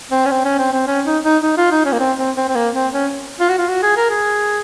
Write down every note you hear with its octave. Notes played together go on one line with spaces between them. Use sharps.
C4
C#4
C4
C#4
C4
C4
C#4
D#4
D#4
D#4
F4
D#4
C#4
A#3
C4
C4
C4
C4
A#3
C4
C#4
F4
F#4
F4
F#4
G#4
A#4
G#4